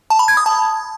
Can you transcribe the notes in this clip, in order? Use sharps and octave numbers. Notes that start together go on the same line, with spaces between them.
A5
B5
G#6
D#6
A5